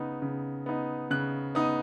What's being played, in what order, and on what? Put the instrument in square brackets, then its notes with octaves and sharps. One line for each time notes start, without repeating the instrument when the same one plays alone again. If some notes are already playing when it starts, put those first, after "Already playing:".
Already playing: [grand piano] C#3 B3 D#4
C#3
B3 D#4
C#3 F#6
B3 D#4 D#6